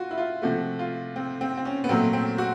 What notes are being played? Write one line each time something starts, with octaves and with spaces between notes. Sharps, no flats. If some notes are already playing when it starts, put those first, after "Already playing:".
Already playing: F4 F#4
E4
F4
C3 F3 A3 F#4
F4
C4
C4
C4
C#4
B3
A#2 F#3 A3 C4
C4
F#4